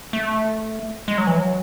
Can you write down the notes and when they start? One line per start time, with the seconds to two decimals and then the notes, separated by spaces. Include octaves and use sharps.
0.13 A3
1.08 G#3
1.18 F#3
1.27 E3
1.37 F#3